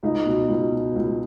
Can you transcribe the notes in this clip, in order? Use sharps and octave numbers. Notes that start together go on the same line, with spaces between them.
C#2 D#4
B2
C#2
B2
C#2